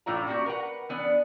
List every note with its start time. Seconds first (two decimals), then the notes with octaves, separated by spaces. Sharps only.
0.06 A2 E3 D4 F4 C#5 A#5
0.27 A#3 D4 E4 F#4 G4
0.46 A#4 B4 F#5
0.89 E3 B3 D4